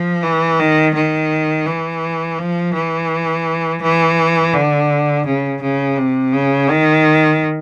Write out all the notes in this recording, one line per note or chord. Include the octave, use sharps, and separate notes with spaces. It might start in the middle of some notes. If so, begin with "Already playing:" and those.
Already playing: F3
E3
D#3
D#3
E3
F3
E3
E3
D3
C#3
C#3
C3
C#3
D#3